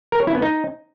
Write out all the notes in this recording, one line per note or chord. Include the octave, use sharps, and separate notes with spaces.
A#4
C#5
E4
B3
D#4